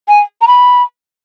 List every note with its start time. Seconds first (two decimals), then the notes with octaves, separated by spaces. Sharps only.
0.08 G#5
0.41 A#5
0.47 B5